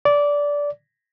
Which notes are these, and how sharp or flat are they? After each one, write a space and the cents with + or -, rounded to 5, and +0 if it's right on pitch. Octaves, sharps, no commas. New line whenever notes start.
D5 -15